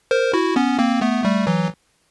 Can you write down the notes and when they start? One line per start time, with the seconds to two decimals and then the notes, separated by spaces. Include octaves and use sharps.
0.11 A#4 C5
0.33 E4 F#4
0.56 B3 C#4
0.79 A#3 C4
1.01 A3 B3
1.24 G3 A3
1.47 E3 F#3